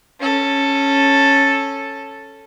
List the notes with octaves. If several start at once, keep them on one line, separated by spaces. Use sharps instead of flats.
C#4 A4